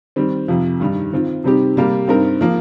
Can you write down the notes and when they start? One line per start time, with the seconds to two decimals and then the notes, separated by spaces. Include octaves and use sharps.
0.16 D#3 G3 C4
0.48 F2 C3 F3
0.80 G2 D#3 G3 D#4
1.12 D#3 C4 F4
1.44 C3 G3 C4 D#4 G4
1.76 C3 G3 A#3 G4
2.08 G2 G3 C4 D#4 A#4
2.41 F3 A#3